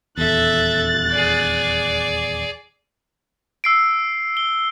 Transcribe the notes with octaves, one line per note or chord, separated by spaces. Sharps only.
D#1 E2 A4 E5 F#6 A6
G#4 D5
E6 C7 D7
G7